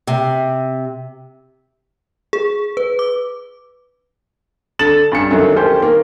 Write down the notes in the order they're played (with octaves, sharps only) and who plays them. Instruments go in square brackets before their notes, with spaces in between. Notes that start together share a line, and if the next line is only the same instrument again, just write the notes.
[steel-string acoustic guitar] C3
[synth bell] G#4
B4
D6
[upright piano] D3 A4 A6 E7 F#7
G2 C#4 C#7
F#2 D3 D#3 F#3
A#3 C#4 G4 A4 C5
D#3 A#3